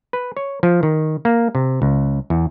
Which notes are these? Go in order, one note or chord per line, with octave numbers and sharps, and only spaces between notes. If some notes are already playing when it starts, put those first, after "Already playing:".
B4
C#5
F3
D#3
A#3
C3
C#2
E2